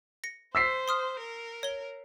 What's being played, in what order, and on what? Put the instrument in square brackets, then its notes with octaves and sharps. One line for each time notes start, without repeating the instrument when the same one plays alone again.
[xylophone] A#6 C#7
[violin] C5 [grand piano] E6 B6 C7
[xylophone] C6 D#6 F6
[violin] A#4
[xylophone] C#5 G7